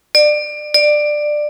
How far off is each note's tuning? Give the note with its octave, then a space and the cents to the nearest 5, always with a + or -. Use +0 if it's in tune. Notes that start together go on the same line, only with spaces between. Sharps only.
D5 +25
D5 +15